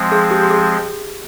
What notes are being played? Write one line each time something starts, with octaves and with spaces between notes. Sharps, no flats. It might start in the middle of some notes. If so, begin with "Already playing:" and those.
Already playing: F3 G#3 C4
G#4
G4
G4
G#4